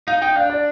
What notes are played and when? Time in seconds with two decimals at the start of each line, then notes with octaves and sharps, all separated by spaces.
0.07 D#4 F5
0.22 D#4 G5
0.36 D4 F5
0.50 D5